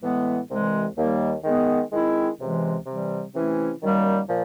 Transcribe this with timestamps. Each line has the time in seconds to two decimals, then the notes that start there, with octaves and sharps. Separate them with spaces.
0.01 A2 E3 G#3 B3
0.49 C2 C3 E3 G#3
0.96 D#2 D#3 G3 A#3
1.43 D#3 G#3 B3
1.91 D#3 G#3 C4 E4
2.38 C#2 C3 E3 G#3
2.85 C3 E3 G3
3.33 C3 E3 A3 C#4 E4
3.81 F#2 D#3 G3 A#3
4.28 A#2 F3